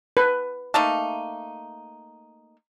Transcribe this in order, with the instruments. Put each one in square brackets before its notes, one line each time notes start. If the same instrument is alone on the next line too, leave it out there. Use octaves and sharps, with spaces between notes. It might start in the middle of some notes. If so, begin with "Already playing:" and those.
[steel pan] B4
[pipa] A3 A#3 D#4